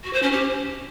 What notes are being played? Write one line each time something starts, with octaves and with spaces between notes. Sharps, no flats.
F#4
C5
C#4
G4